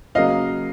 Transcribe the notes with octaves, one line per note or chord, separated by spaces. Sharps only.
C#3 F#3 A#3 D#5 F5